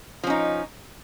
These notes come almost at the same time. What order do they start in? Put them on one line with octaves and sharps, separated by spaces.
F3 C#4 D#4